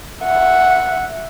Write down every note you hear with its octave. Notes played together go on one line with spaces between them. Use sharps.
E5 F#5